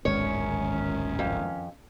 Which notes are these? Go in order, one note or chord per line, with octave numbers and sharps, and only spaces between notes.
D1 G#1 F#2 D#3 G#3 C#4 C#5
F2